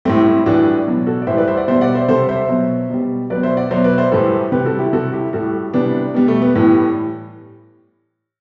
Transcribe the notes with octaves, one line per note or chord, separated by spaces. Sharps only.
A2 G3 A3 C4
C4 E4
A2 E3 G3 D4 F#4
B2 F#3
F#4 A4
D5
A2 E3 G3 C5 E5
B4 D5
C5 E5
D5 F#5
B2 G3 C5 E5
D5 F#5
C5 E5
C3 G3 A4 C5
C5 E5
B2 F#3
B2 G3
B2 F#3 B4 D5
C5 E5
D5 F#5
B2 F#3 C5 E5
B4 D5
C5 E5
A2 E3 G3 A4 C5
C3 G3 G4 B4
F#4 A4
E4 G4
C3 G3 F#4 A4
E4 G4
A2 G3 F#4 A4
C3 E3 G3 B3 D4
B2 G3 B3
A3
B3
A2 E3 G3 B3